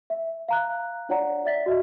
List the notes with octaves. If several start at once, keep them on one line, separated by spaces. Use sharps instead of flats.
E5
F5 A#5 F#6
D4 F4 C#5 D5 F#5 A#5
D5 E5 A6 B6
F#4 D#5 E5